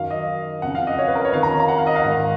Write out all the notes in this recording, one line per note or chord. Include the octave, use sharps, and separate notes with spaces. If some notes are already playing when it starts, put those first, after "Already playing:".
Already playing: F#2 D#3 F5
D#5
F2 C#3 F#5
F5
D#5
C#5
B4
A#4
C#5
F2 D#3 F5
A#5
A#5
F#5
F5
D#5
F5
G#2 D#3 F#5